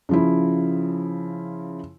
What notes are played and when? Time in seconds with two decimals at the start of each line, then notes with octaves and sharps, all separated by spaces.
0.09 C#3 F3 E4